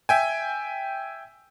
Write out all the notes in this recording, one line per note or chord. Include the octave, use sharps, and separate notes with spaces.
E5 G5 G#5